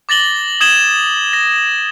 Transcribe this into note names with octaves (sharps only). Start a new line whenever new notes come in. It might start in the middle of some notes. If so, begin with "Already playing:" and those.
D6 A6 A#6 F#7 G7
D#6 G#6 E7 F#7 G7
A#6